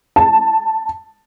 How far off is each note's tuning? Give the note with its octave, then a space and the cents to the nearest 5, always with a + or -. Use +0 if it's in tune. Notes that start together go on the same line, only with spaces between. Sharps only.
A5 +5